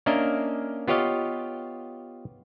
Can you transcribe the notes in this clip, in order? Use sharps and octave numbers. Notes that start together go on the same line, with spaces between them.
A#3 C#4 D4 A#4 D#5 E5
B3 F4 G4 C#5 D#5 F5